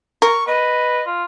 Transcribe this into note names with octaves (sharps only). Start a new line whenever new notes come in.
A#4 C#6
B4 D#5
F4